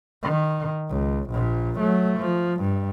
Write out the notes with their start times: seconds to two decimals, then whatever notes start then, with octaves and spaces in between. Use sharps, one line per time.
0.23 D#3
0.90 C#2
1.31 A#1 A#2
1.80 F#3 A3
2.18 F3
2.61 G2